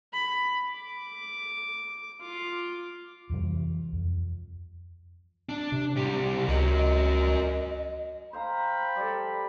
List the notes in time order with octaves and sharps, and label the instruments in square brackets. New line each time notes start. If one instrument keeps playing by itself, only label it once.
[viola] B5
D6
F4 D6
[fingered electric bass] F2 C3 E3 G3
F2
[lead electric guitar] D4
[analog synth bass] C3
[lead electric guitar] C2 G4
[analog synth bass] C#2 [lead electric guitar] F#4 A#4 [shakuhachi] D#5
[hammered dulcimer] C5 F5 A#5 [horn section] G5 B5
[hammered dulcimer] G3 A4